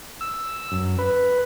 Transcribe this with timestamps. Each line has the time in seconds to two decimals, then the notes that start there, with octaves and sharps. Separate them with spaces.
0.21 E6
0.72 F#2
0.99 B4